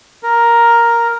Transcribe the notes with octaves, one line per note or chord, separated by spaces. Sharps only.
A#4